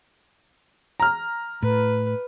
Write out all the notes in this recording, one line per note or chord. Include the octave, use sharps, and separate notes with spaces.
A#5 F6
A2 B4